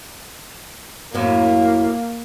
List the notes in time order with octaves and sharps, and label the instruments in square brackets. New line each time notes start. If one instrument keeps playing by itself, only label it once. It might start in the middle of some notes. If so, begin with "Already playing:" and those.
[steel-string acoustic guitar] F#2 A2 E4 [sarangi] A#3